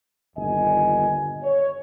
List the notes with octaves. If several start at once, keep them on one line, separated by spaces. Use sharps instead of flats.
G1 D#2 A#2 D#5 G#5
C#5